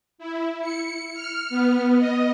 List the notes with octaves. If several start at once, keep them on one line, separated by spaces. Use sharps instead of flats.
E4
C#7
F6
B3
D#5